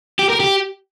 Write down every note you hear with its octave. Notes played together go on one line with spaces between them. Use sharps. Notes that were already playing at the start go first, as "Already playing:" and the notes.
G4
A#4
G4